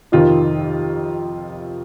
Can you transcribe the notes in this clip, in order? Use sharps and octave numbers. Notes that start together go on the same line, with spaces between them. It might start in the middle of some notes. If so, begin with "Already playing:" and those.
F2 C3 D#3 F4